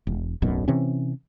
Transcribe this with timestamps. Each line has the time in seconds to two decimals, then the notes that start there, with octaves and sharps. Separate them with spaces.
0.07 E1
0.42 D1 B1 F#2 B2
0.68 C3 E3 C4 C#4